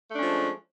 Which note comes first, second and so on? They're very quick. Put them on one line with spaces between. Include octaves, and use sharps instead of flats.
A3 D4 C#4 F3 G#3